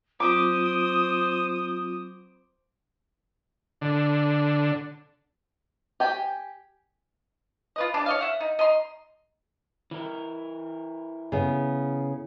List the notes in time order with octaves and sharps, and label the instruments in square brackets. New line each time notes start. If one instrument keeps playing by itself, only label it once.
[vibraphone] F#3 C4 F4 [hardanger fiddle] C5 [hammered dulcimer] D6 [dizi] D#6
[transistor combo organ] D3
[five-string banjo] G4 G5 G#5
[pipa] F4 B4 D#5
D4 G#4 D5
C#5 D#5 F5
E5 F#5
D#4
D#5 A#5 C6
[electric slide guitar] E3 A#4
[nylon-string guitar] C#3 B3